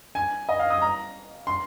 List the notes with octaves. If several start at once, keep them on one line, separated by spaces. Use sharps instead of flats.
G#5
D#5
F5
D#6
A#5
C6